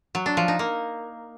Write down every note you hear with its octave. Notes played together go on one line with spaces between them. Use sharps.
F#3
D4
F3
D#4
A#3